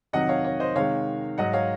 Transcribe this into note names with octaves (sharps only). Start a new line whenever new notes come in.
F2 C3 D#3 F#3 D#5 F#5
C#5 F5
C#5
C5 D#5
C3 D#3 G#3 C#5 F5
G#2 F#3 D#5 F#5
C#5 F5